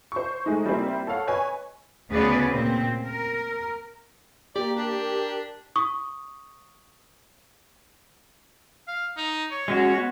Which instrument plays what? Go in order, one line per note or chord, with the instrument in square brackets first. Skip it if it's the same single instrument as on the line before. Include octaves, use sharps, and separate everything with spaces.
[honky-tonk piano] C5 C#6
G#3 A3 D#4
G3 A#3 C4 E4
A4 C#5 F5 F#5
B4 C#5 D#5 G#5
[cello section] D2 C#3 B3 G#4 B4 D5
A#2 C4
A#4
[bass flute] A#3 [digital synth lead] G4 [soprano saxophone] D5
[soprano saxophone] D4 [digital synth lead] G4
[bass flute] A#4
[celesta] C#6 D#6
[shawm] F5
D#4
C#5
[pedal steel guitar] G#3 C#4 F#4
B3